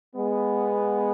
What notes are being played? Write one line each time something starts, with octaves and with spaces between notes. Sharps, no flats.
G#3 B3